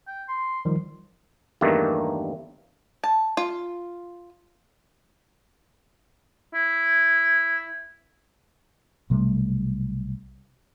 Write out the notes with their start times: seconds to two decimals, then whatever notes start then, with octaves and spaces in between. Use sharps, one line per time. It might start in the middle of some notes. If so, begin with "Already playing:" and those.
0.07 G5
0.28 C6
0.65 D#3 F3 G3
1.61 E2 G2 D#3 A3 A#3
3.04 A5
3.37 F4
6.55 E4
9.10 B1 C3 G3 A3